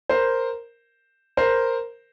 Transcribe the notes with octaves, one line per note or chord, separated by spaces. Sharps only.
A#4 C5
A#4 C5